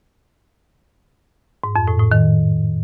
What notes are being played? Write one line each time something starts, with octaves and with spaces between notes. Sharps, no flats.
G#2
F2
A2
A2
D#3